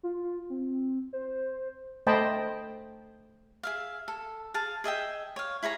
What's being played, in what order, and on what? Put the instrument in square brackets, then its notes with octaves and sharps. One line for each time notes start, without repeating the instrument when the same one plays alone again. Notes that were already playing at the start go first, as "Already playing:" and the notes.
[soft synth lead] F4
C4
C5
[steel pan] A3 C5 D#5 G5 A5 B5
[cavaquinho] G#4 E5 F5
A4
G#4 F5 A5
G#4 D#5 E5 G5
C#5 F5
E4 G#4 C#5 A#5